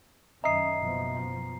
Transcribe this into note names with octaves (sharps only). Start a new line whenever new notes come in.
F#2 D#3 C#4 D#5 E5 A#5 D#6 C7
F#1 B2 F3